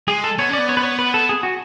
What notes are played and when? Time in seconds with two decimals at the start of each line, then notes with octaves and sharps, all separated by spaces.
0.08 G#3 G#4
0.24 A4
0.38 B3 C#5
0.49 C#4
0.53 B3 D5
0.69 C#5
0.77 B4
0.83 C#5
0.99 B4
1.14 A4
1.29 G#4
1.43 F#4